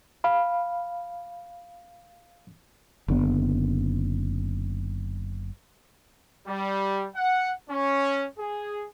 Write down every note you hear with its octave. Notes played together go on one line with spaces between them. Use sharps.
F5 B5
F#1 D3 B3
G3
F#5
C#4
G#4